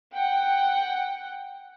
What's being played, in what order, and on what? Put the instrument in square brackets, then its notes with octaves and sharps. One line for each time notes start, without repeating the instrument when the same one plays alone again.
[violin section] F#5 G5